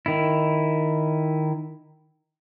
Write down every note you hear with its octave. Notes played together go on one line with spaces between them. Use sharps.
D#3 E4